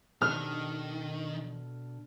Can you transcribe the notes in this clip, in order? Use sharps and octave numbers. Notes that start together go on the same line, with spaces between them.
B2 D#3 D4 A4 F6